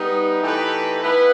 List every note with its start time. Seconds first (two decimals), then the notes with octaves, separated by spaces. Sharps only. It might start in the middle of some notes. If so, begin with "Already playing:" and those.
Already playing: G3 B3 D#4
0.42 E3 A3 D#4 G4 B4
1.01 B3 E4 B4